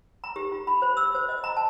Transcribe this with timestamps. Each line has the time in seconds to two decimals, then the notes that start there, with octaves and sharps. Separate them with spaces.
0.24 A#5
0.36 G4
0.52 F4
0.67 B5
0.82 C5
0.97 E6
1.15 C5
1.29 D#5
1.44 A#5
1.57 A5